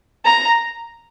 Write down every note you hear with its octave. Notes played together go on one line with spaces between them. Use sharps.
A#5